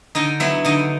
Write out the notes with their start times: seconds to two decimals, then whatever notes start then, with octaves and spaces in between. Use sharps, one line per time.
0.15 D3 D#4 D#5
0.40 F#3 B3 E4 E5
0.65 D3 D#4 D#5